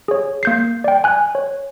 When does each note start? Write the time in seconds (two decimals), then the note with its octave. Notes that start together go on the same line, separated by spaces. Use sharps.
0.08 G#4 C#5
0.43 A#3 G6 C7
0.84 D5 G5
1.04 G#5 F#6
1.35 C#5